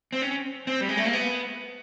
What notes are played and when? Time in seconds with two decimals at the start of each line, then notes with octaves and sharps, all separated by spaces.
0.12 C4
0.22 C#4
0.67 C4
0.81 G3
0.89 G#3
0.97 A3
1.05 A#3
1.13 B3